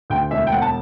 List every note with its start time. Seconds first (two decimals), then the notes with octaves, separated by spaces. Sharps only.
0.10 D2 G5
0.31 E1 E5
0.47 G5
0.52 E1 F#5
0.62 A5